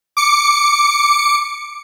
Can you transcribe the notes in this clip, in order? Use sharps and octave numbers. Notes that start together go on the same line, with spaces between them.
D6 C#7